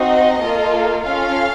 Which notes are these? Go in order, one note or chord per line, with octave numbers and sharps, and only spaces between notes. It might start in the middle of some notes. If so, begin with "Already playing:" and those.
Already playing: C4 D#4 F#4 D#5
A#3 F4 A4
C#4 F4 A4 F5